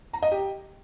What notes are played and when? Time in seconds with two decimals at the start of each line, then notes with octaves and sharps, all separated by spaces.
0.13 A#5
0.23 D#5
0.32 G4